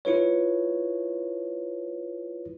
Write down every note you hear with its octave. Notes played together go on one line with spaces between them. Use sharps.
E4 F4 B4 C#5